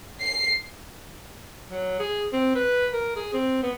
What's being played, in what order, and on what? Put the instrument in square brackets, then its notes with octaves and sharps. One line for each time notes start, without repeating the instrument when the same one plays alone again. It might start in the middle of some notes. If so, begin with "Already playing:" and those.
[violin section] C7
[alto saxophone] F#3
G#4
C4
B4
A#4
G#4
C4
B3